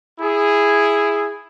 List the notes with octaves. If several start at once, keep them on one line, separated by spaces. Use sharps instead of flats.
E4 G#4